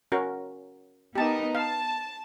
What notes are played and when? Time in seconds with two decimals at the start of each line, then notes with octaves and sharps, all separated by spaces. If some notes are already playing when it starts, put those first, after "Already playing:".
0.12 C#4 F#4 A#4
1.15 B3 D#4 G4 A#4 A5
1.55 F5 A5